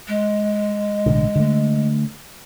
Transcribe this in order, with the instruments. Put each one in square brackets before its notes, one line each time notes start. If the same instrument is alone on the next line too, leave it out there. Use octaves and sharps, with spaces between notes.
[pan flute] G#3
[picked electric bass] A1 B2 D3
D3 A3